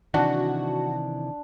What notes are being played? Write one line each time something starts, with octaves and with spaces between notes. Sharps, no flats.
C3 D#3 E3 D4 F#4 F#5